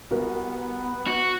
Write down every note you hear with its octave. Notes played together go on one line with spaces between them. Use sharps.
C2 B3 F#4 A#4 B4
F#4